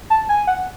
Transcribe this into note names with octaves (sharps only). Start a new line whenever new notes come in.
A5
G#5
F#5